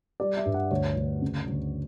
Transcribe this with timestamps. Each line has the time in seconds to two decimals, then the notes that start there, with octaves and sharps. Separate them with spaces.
0.20 G3 D5
0.37 E5
0.45 G2
0.54 F#5
0.71 D2 C#5
0.96 D2
1.22 C#3
1.48 D2